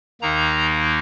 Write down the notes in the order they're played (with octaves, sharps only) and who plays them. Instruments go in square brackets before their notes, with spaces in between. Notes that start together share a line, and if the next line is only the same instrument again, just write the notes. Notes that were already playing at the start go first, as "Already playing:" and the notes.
[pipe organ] D#2 D#3 A#3 D#4 A#5